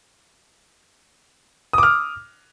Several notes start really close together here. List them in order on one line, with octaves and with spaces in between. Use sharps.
D#6 D6 F6